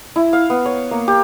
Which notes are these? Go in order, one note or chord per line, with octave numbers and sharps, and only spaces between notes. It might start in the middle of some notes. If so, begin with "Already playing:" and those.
E4
F5
B3
C#5
A#3
G4